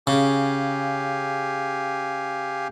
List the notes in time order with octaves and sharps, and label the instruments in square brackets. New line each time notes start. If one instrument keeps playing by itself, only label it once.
[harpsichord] C#3 [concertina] G4 F5 G#5